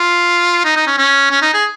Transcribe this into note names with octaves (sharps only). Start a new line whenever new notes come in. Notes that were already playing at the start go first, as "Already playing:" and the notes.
Already playing: F4
D#4
D#4
C#4
C#4
C#4
D#4
G#4